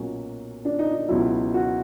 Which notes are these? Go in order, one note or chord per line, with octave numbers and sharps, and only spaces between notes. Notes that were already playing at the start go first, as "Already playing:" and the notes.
Already playing: B1 A#2 F#3 C#4
D4
D#4
D#4
C#2 B2 F#3 E4
F#4